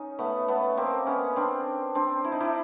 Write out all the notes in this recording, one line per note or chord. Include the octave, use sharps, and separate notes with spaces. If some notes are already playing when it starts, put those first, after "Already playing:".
Already playing: C#4 D#4
A3 B3
A3 B3
A#3 C4
B3 C#4
C4 D4
C4 D4
E4
D#4
D4 E4